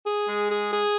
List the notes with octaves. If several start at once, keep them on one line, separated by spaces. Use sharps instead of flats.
G#4
G#3
G#4
G#4